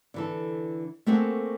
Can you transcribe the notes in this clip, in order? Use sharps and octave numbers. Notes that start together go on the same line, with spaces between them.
D3 E3 A4
A3 A#3 C4 F#4 G#4 A4